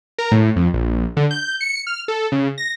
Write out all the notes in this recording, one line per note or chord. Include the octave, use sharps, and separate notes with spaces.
A#4
A2
F2
A#1
D3
G6
C#7
F6
A4
C#3
A#6